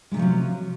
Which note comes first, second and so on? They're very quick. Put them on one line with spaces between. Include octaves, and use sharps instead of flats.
G#3 C3 F3 F#3 C#4